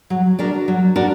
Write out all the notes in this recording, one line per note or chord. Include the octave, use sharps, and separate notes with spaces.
F#3
D4 F#4 A#4 D5
F#3
D4 F#4 A#4 D5